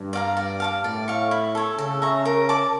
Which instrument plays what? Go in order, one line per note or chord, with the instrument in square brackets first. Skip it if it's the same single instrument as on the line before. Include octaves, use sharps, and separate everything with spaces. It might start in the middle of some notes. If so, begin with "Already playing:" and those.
Already playing: [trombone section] G2
[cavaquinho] D5 F5 A#5
D5
F5 A5 D6
[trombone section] A2 [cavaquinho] D5
[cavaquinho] F5 C#6
E4
A4 C#5
[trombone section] C#3 [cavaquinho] A4
[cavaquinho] E5 A#5 C#6
A#4
D5 A5 D6